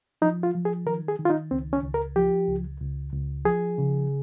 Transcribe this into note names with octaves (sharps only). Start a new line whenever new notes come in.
F3 D#4
F4
F3
G#4
D#3 A#4
G#4
D#3
F4
D#4
C#2 C4
C#4
C#2
A#4
F3 G4
C#2
C#2
C#2
F3 G#4
C#3